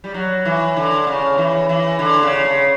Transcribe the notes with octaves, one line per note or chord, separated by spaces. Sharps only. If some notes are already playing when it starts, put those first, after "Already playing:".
G3
F#3
E3
D3
C#3
E3
E3
D3
C#3
C#3